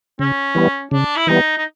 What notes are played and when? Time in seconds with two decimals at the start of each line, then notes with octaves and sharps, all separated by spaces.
0.19 C#3 C#4
0.55 E3 G3 B3
0.91 C#3 D4
1.17 E4
1.27 E3 G3 B3 D#4
1.58 D#4